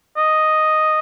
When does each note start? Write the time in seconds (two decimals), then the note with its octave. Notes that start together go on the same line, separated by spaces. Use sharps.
0.17 D#5